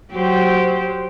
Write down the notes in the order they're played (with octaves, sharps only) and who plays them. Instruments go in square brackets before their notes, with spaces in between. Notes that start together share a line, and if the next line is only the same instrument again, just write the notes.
[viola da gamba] F#3 G4 C5